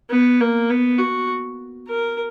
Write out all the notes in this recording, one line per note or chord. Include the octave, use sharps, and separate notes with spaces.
B3
A#3
B3
F#4
A#4